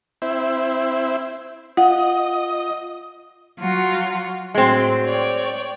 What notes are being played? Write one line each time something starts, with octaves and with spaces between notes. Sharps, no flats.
C4 E4
F4 D#5 F#5
F#3 F4 F#4
A2 F#3 G#3 C4
C#5 D5 G5